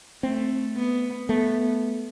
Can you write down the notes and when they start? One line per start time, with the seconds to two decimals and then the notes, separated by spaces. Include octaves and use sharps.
0.23 A3 C4
0.76 B3
1.29 A3 B3